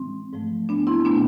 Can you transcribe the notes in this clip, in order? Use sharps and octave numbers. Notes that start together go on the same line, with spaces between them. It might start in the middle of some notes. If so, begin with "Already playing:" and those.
Already playing: A2 E3 G#3 C4
G#2 F3 A3
B3 D4
C4 E4
B2 A3 B3 D4